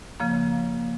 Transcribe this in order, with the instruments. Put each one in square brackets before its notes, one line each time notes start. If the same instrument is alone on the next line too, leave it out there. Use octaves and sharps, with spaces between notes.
[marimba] C#3 F3 A#3